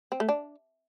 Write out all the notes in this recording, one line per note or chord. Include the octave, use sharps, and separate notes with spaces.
C4
A3
D4